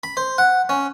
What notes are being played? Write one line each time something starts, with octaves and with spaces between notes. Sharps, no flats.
B5
C5
F#5
C#4